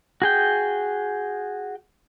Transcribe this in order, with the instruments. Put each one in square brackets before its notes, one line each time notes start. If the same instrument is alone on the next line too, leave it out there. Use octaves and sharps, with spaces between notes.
[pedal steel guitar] F#4 G#4 G5